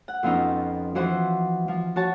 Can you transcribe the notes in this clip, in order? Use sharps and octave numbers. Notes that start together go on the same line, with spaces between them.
F#5
F2 F3 B3 C#4 D#4 F4
E3 F3 F#4 C5 F#5
F3
F#4 C#5 A5